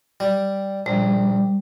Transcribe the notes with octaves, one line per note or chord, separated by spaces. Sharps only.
G3
A#1 G3